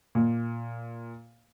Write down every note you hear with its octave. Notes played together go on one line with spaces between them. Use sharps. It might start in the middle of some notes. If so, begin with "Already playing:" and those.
A#2